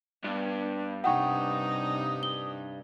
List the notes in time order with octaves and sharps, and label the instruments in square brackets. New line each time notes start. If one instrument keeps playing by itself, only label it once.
[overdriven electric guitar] G2 [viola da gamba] B3
[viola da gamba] C3 D#4 [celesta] F#5 G5 C#6 [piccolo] D#6
[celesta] G7